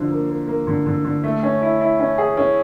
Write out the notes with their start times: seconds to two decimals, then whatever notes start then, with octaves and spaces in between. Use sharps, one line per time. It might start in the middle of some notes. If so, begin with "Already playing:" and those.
Already playing: D3 F3
0.11 A#3
0.29 A#3
0.48 A#3
0.67 D3
0.86 D3
1.04 D3
1.24 A3
1.43 C#4
1.62 E4
1.81 E4
2.00 C#4
2.18 G#4
2.37 C#4